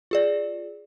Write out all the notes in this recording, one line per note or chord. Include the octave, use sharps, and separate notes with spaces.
F4 G#4 D5